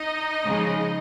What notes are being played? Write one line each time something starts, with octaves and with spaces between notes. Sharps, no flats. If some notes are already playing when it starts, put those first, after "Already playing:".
Already playing: D#4 D#5
C#3 F3 G#3